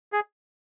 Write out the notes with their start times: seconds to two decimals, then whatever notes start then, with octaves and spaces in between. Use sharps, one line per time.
0.13 G#4